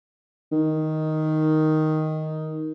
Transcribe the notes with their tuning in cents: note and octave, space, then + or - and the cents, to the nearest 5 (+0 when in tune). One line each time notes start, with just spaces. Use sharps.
D#3 +5